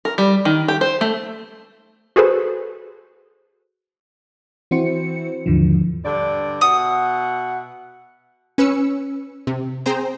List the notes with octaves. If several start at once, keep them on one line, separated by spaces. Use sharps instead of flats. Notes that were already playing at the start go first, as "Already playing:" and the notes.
A#4
G3
D#3
G4
C5
A3
F#4 G#4 A4 B4 C5
E3 C4 E4 F#4 C5 C#7
D#2 G#2 D3 E3 F3
G2 D3 D5
B2 E5 F#5 D#6
C#4 B4 E6 C#7
C3
C4 G#4 C5 G5 A#5